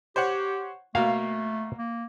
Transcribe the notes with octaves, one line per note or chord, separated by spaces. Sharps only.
G4 C5 C#5 F#5
B2 A3 A#3 F5
A#3